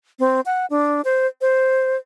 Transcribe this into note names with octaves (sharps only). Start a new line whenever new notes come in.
C4
F#5
D4
C5
C5